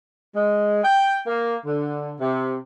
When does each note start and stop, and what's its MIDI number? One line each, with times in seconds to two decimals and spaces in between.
0.36 0.81 56
0.84 1.18 79
1.27 1.57 58
1.65 2.15 50
2.20 2.56 48